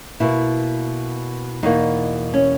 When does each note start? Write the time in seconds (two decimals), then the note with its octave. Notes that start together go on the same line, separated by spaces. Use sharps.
0.20 B2 A#3 E4
1.63 E2 B2 A#3 D#4
2.34 C#4